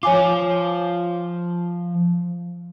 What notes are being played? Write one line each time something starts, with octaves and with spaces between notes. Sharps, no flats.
F3 F4 C#5 G#5 D6